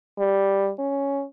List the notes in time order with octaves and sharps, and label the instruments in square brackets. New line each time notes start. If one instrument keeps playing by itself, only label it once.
[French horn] G3
C#4